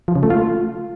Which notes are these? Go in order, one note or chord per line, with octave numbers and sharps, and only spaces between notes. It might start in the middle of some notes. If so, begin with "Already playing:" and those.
F3
C#3
A3
F4